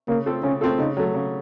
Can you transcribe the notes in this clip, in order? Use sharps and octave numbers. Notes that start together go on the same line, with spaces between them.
C#3 A#3
A3 C4 F4 A4
C#3 C#4
A3 C4 F4 A4
C#3 D#4
F#3 A3
C#3